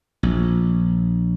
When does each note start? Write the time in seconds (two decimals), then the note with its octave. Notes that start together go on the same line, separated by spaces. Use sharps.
0.23 A#1